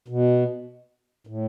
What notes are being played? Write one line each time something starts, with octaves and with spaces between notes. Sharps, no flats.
B2
A2